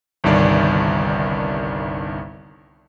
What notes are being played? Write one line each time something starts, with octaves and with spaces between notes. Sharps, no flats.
G1 C2 G2 D#3 D5